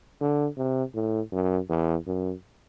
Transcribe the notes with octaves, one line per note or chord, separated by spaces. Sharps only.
D3
C3
A2
F#2
E2
F#2